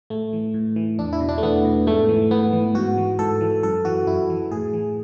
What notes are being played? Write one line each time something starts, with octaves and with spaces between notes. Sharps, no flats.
A2 A3
E3
A2
E3
E2 D4
E4
B2
D4
A3
E2 B3
B2
G#2 A3
E3
G#2 B3
E3
G#2 F#4
E3
G#2 A4
E3
F#2 A4
E3 F#4
F#2 E4
E3
A2 G#4
E3